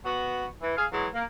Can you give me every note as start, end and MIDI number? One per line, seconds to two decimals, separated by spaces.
0.05 0.45 59
0.05 0.45 66
0.62 0.71 52
0.77 0.86 68
0.77 0.86 77
0.92 1.07 52
0.92 1.07 54
0.92 1.07 56
1.13 1.23 58